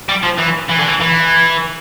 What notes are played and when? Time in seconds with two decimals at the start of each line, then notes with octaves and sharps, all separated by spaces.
0.09 G3
0.23 F3
0.38 E3
0.69 E3
0.78 D3
0.88 E3
1.00 E3